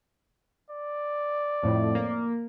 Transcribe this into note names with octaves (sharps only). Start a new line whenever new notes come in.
D5
F2 A2
A#3